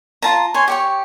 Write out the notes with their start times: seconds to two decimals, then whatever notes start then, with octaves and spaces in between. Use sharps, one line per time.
0.22 F4 A5 A#5
0.54 C#5 G#5 C6
0.68 G4 C#5 C#6